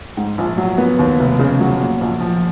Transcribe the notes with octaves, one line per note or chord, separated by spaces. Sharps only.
G#2
A#1
F#3
B3
D#2
F1
C#3
F#3
A#2
A#1
F3